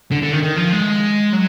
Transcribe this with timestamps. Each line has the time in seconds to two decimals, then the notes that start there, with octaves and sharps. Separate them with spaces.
0.11 D3
0.22 D3
0.33 D#3
0.43 D#3
0.57 F3
0.73 G#3
1.33 F#3